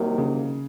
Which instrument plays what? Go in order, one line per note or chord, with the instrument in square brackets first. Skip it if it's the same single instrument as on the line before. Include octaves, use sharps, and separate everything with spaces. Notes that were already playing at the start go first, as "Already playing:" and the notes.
Already playing: [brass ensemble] C2 C3 D#3 F#3 A#3
[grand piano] C#3